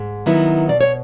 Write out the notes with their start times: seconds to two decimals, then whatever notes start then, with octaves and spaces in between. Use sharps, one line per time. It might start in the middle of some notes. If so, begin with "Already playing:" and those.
Already playing: G#2
0.26 D#3 F#3 B3 E4
0.69 B2 D5
0.81 C#5